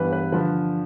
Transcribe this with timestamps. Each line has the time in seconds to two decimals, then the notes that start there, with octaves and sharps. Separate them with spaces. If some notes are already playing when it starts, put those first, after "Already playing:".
Already playing: G2 E3 B3 B4
0.13 B4
0.32 D3 F3 B4